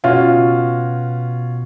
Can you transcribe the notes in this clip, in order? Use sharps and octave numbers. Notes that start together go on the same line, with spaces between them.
B2 C#4 F4 F#4